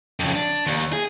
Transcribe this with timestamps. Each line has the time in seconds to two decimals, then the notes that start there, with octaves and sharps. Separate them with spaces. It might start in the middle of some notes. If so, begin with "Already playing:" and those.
0.20 F2 C#3
0.35 D4
0.66 D#2
0.93 G#4